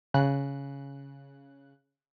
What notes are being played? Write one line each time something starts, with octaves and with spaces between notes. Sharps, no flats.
C#3 F#6